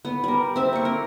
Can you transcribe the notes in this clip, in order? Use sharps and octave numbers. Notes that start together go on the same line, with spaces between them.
B3
G3 A#4
C4 E5
A#3 C#6
A#4